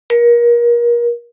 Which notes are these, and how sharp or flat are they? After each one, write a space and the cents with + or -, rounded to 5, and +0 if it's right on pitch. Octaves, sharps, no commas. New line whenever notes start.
A#4 +30